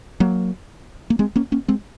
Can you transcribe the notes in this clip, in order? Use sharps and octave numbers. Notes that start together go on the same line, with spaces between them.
F#3 A#3
A#3
G#3 C4
A#3 C#4
A#3 C#4
G#3 C4